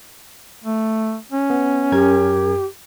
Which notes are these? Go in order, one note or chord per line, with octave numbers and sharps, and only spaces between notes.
A3
C#4
B3
F#2 G4 A#4 G#6